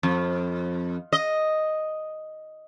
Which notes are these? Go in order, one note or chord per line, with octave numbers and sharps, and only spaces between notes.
F2
D#5